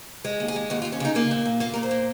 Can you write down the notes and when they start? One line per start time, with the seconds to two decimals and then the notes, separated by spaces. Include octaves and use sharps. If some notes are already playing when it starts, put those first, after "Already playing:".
0.25 G#3 G#4
0.40 D#2
0.48 G#4
0.56 G#3
0.70 D#2 F#4
0.82 F4
0.85 D#2
0.92 C#4
1.00 C#3 D#4
1.15 A#3 F4
1.31 A#2
1.45 A#2
1.60 A#3 F4
1.74 A#2 A#4
1.83 C5
1.91 A#3